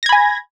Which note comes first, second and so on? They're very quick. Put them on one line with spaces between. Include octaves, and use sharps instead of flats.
A#6 G#6 B5 G#5